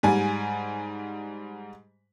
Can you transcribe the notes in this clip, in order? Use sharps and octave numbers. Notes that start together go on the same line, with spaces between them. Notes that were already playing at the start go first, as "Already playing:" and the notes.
G#2 G3 G#5